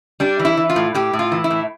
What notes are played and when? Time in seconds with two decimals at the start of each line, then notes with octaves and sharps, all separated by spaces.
0.20 G3 D4
0.39 E3
0.45 E4
0.57 E3
0.70 F4
0.76 A2
0.94 A2 G4
1.13 A2
1.19 F4
1.32 E3
1.44 E4
1.50 A2